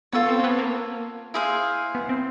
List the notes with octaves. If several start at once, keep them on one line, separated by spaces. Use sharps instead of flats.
B3 F4 A4 C#5
C4
C4
B3
A#3
E4 G#4 C5 F5
B3
C4